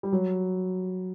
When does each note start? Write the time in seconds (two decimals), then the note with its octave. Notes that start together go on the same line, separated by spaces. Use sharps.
0.03 G3
0.12 F#3